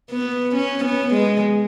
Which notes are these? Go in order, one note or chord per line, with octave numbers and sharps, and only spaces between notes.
B3
C#4
B3
G#3